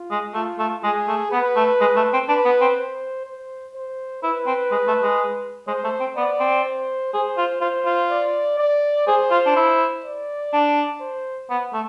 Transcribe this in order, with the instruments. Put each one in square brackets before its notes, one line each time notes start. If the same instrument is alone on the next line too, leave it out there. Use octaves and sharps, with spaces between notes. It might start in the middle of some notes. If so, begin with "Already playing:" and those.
Already playing: [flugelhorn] F4
[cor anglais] G#3
[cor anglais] A3 [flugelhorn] F4
[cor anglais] A3
[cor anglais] G#3 [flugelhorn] G#4
[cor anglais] A3
[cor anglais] B3 [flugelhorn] B4
[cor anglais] A3
G#3
A3
C4
[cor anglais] D4 [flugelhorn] B4
[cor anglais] B3
C4
[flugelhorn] C5
C5
C5
[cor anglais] E4 [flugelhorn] B4
[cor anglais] C4
G#3
A3
G#3
[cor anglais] G#3 [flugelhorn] C5
[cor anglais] A3
C4
[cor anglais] B3 [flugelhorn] D5
[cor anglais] C4
[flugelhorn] C5
[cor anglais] G#4 [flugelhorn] C5
[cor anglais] F4
[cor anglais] F4 [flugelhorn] C5
[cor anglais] F4
[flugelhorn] D5
D5
[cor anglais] G#4 [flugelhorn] C5
[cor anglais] F4
D4
E4
[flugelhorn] D5
[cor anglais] D4
[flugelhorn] C5
[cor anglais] B3
A3